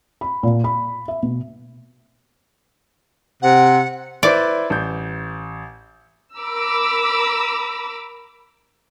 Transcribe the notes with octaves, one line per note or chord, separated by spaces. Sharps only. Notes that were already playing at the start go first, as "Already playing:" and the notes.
B5
A#2
B5
E5
B2
C3 F#5
E4 B4 C5 D5
A1 G6
A#4 A#5 B5 D6 E6